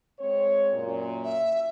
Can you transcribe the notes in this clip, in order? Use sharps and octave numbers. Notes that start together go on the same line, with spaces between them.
G#3 C4 C#5
F#2 A#2
E5